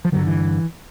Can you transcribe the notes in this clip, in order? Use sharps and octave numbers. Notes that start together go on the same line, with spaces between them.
F3
G2 D3 F#3
E3